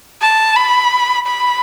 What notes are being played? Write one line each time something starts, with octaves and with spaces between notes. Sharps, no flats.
A5
B5
B5